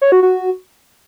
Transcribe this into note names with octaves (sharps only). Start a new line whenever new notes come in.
C#5
F#4
F#4